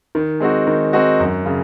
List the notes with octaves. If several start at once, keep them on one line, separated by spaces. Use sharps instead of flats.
D#3
G#3 C4 D#4 F#4
D#3
G#3 C4 D#4 F#4
F#2
C#3